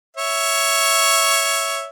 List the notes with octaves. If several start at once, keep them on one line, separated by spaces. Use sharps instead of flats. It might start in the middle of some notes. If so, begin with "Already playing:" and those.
C#5 E5